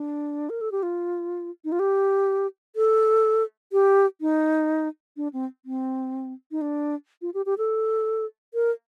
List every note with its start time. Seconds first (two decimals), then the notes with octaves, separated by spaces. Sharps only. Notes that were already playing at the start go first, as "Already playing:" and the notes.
Already playing: D4
0.50 A#4
0.61 A4
0.72 G4
0.83 F4
1.65 D#4
1.72 F4
1.79 G4
2.76 A4
3.72 G4
4.21 D#4
5.17 D4
5.33 C4
5.65 C4
6.51 D#4
6.61 D4
7.22 F4
7.34 G4
7.46 G4
7.58 A4
8.54 A#4